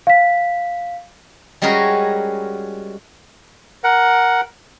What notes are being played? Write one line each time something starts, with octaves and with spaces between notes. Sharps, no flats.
F5 B6
G3 G#3 C#4 F#4 G#4 A#4
A#4 F#5